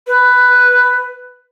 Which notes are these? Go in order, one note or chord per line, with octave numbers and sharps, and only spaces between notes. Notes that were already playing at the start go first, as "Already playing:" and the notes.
B4